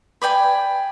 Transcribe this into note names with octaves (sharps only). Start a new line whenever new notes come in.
B4 D5 G5 G#5